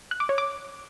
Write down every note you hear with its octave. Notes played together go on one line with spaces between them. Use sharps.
F#6
D6
C#5
D6